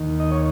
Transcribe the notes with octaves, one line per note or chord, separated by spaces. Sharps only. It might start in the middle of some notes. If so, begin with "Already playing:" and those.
Already playing: D#2 D#3
D#5
C#5